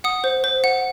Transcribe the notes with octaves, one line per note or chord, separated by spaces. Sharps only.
F#5 D#6
C5
C5
F#5